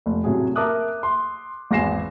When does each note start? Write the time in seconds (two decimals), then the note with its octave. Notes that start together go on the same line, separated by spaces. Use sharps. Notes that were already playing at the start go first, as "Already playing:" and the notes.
0.06 F1
0.24 A2 C3 F#3 C#4 G#4
0.56 A#4 E5 A5 D6 D#6 F#6
1.03 C6
1.71 G#1 E2 G#5 A#6 C7 E7